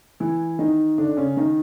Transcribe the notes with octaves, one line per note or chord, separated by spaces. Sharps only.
E3 E4
D#3 D#4
D3 D4
C#3 C#4
D#3 D#4